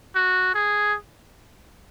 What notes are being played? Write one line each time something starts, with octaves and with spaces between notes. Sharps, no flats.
F#4
G#4